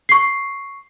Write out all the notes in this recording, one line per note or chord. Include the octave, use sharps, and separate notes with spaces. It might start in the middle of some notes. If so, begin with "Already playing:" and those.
C#6 C7